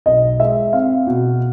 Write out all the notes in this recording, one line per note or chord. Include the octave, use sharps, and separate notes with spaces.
B1 D#5
G#3 E5
C4 F5
B2